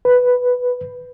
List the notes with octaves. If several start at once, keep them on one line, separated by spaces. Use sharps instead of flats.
B4